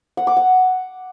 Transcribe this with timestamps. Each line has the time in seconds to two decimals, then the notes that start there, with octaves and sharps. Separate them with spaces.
0.17 F#5
0.27 D6
0.37 F#5